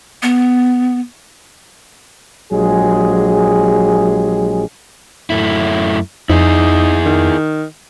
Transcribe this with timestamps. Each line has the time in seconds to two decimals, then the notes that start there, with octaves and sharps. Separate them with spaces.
0.23 B3
2.52 A#1 F#3 G#3 G4 G#4
5.30 F#2 A3 E4
6.30 F2 D#4 E4 G#4
7.06 D#3